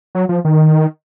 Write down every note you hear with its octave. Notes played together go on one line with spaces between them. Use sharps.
F#3
F3
D#3